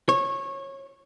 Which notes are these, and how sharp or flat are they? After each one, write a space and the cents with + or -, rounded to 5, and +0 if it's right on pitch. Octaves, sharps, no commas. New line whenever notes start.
C#5 -20